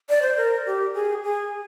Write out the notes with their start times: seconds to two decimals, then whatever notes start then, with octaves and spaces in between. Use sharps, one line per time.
0.09 D5
0.22 C5
0.37 A#4
0.66 G4
0.94 G#4
1.23 G#4